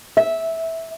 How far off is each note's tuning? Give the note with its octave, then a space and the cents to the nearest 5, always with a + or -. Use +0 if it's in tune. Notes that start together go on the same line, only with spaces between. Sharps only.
E5 -10